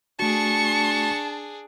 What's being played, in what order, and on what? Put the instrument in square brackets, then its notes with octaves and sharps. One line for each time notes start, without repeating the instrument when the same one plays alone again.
[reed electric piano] A3 F#4 [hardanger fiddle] D4 G#4 [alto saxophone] A5 [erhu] C#6